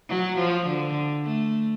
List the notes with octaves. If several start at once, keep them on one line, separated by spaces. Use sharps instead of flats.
F#3
F3
D3
A3